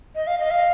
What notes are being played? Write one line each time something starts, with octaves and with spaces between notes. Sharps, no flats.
D#5
F5
D#5
F5